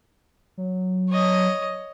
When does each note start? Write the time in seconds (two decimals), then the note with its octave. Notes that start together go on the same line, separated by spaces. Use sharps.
0.58 F#3
1.10 C#5 D#5